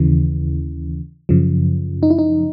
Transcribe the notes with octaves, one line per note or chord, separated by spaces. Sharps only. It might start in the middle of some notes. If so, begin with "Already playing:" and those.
Already playing: D#2 C#3 E3
F#2 C#3 F3
D#4
E4
D#4